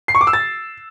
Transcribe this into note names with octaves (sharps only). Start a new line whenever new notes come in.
C7
C#6
D6
E6
A6